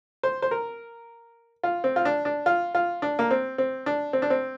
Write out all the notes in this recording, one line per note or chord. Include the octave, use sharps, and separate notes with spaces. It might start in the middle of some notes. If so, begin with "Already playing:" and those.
C5
C5
A#4
F4
C4
F4
D4
D4
F4
F4
D4
A#3
C4
C4
D4
C4
D4
C4